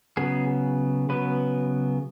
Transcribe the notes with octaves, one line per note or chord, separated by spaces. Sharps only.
C#3 F#3 B3 G#4
C#3 F#3 B3 B4